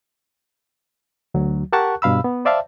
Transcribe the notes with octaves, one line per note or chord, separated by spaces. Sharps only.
D2 F#3
G4 A#4 F#5 A5 C#6 F#6
G2 B2 F5 B5 E6
B3
C5 D5 E5 F5 A5